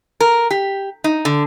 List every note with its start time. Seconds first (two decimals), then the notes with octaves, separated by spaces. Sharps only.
0.20 A#4
0.51 G4
1.04 D#4
1.25 D3